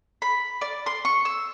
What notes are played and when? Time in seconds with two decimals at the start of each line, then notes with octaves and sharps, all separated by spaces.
0.22 B5
0.61 D5
0.86 C6
1.05 C#6
1.25 E6